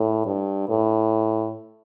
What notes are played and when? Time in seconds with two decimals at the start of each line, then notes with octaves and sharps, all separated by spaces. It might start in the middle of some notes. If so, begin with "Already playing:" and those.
Already playing: A2
0.26 G2
0.69 A2